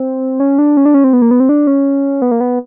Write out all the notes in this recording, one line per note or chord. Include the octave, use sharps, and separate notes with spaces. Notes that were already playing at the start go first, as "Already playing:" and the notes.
Already playing: C4
C#4
D4
C#4
D4
C#4
C4
B3
A#3
B3
C4
D4
C#4
B3
A#3
B3